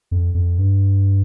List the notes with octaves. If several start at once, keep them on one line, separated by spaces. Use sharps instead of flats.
F2
F2
G2